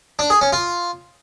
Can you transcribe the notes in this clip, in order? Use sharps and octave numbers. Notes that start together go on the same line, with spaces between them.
D4
G#4
C#4
F4